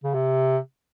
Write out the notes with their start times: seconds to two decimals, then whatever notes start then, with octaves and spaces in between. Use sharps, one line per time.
0.04 C#3
0.14 C3